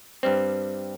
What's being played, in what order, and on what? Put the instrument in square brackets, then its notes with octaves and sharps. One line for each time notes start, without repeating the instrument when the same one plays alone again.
[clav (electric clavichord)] G2 G3 C4